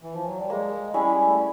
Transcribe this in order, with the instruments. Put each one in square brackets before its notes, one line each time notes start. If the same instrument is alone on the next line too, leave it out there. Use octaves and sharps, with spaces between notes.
[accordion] E3
F3
F#3
G3
[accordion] G#3 [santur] A#3
[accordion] G3 [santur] C#4 E4 G#4
[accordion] A3